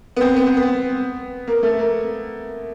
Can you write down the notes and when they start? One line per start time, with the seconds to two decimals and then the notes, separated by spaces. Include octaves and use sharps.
0.16 B3
0.21 C4
0.36 B3
0.46 C4
0.57 B3
1.47 A#3
1.63 A3
1.79 A#3